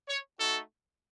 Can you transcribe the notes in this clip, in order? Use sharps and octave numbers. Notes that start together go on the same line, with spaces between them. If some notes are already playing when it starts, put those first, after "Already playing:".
C#5
A3 D#4 F#4 A4